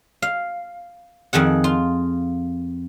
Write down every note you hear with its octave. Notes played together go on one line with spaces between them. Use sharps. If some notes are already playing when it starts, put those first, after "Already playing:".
F5
F2 D#3 G#4 F#5
F4